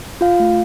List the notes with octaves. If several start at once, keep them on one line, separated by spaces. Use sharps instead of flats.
F4 F5
A3